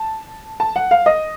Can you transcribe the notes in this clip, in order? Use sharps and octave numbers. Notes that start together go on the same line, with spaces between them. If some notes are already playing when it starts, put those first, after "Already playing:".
Already playing: A5
A5
F#5
F5
D#5